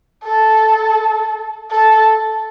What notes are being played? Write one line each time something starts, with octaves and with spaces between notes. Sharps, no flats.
A4
A4